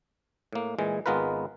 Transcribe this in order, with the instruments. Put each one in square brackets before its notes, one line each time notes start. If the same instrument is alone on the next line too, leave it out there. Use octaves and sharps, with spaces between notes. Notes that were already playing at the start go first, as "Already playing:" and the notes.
[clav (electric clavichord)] A2 A#3
A#2 E3 G#3
G#1 G#3 B3 F4 A#4 B4